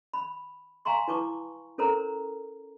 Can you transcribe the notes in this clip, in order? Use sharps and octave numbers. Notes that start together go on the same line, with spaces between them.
B5
F5 G#5 A#5 C6 C#6
E4 B4 A5 C#6 D6
C#4 A4 A#4 C5 A#5